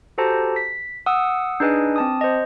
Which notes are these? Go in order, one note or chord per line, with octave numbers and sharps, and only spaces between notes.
F#4 G4 A4 C5 A5 A#5
B6
F#5 D#6 E6
D4 D#4 G#4 B4 D#5 G#5
C4 A5 D#6
C5 D#5